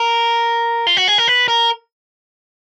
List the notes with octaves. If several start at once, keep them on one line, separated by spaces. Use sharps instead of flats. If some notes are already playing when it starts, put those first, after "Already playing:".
Already playing: A#4
F4
F#4
G#4
A#4
B4
A#4